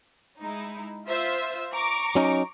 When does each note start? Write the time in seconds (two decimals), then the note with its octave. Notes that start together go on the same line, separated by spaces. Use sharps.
0.39 G#3 D#4 E4
1.08 F4 C5 E5
1.73 A#5 C#6 D6
2.15 F#3 C#4 D#4